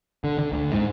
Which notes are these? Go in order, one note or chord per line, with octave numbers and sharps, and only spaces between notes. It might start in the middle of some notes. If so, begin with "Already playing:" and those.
D3
D3
D2
G#2